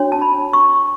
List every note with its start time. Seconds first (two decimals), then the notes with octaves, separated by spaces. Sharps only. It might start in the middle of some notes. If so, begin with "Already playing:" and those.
Already playing: D4 F#4 C#5
0.12 A5
0.22 B5
0.53 C#6